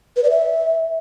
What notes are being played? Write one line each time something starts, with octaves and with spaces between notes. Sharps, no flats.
B4
D5
E5